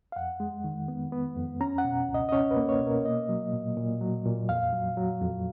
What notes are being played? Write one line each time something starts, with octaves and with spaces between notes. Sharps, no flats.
F5
F2 F#5
G#3
D#3
B3
B3
F2
C#4 A#5
F#5
B2
C#2
D#5
D#5
C#4 C#5
B4
A#3
C#5
B2
A#4
A#3 D#5
F#3
A#2
A#2
F#3
A#2
F2 F5
F#3
F#3
F2